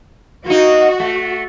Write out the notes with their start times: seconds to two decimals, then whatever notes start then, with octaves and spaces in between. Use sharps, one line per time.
0.46 A#3 D#4 F#4
1.00 A3